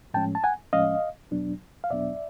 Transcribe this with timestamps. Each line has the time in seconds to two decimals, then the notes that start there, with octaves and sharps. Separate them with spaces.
0.14 A2 F3 G#3 C#4 G5 A5
0.35 A5
0.44 F#5 G#5
0.73 A2 F3 G#3 C#4 D#5 F5
1.31 E2 B2 F#3 B3 D4
1.84 F5
1.90 E2 B2 F#3 B3 D4 D5 E5